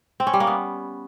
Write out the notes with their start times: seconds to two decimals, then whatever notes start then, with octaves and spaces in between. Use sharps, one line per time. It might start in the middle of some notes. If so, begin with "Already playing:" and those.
0.20 C4
0.27 C#4
0.33 G3
0.40 A#3
0.47 B3